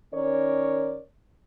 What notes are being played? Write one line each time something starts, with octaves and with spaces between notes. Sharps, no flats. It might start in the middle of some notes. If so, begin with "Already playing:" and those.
D#3 C#4 A#4 C#5 D5